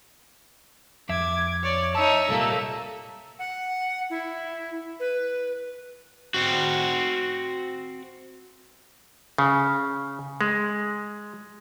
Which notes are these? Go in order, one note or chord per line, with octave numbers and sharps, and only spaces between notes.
F2 E5 D6 G#6
C#5 D5
D#4 C#5 E5 A5
C2 A#2 G3 A3 A#3
F#5
E4
B4
C4 F#4
C#3
G#3